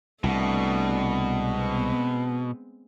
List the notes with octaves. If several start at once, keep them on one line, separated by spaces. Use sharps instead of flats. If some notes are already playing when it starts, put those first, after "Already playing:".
C2 B2 A3 D4
G#3 B3 C4